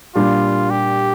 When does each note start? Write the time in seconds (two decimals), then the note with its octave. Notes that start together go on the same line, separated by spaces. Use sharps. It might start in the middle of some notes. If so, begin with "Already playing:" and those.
0.15 A#2 G3 D4 F4
0.70 G4